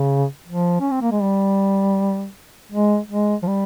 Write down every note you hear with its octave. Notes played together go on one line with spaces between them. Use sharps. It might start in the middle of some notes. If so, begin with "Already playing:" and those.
Already playing: C#3
F3
C#4
C4
A#3
G#3
G3
G#3
G#3
F3
G3